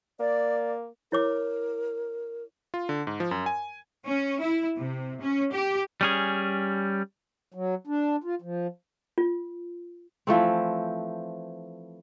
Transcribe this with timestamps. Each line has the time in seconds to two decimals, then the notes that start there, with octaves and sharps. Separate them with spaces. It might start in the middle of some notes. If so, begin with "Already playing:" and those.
0.20 A#3 D5
1.12 E4 A#4 C#5 D6
2.74 F4
2.89 D3
3.07 G#2
3.20 F3
3.31 F#2
3.46 G#5
4.06 C#4
4.42 E4
4.78 C3
5.21 C#4
5.54 G4
6.01 G3 C#4 G#4
7.54 F#3
7.87 D4
8.24 F4
8.42 F3
9.18 F4
10.27 E3 F3 A3 C4